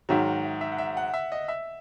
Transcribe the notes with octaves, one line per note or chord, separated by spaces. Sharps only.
G#2 D#3 F#3 E5
F#5
E5
E5
F#5
E5
F#5
E5
D#5
E5